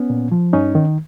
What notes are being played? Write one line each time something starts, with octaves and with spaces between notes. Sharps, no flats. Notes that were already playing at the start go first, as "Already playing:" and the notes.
Already playing: B3 C#4
A#2
F3
G2 C#4 D#4
D#3